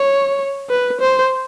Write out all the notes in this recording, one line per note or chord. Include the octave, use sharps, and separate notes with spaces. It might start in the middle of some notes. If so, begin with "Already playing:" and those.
Already playing: C#5
B4
C5